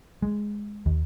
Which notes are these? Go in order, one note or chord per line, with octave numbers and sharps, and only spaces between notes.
G#3
D#2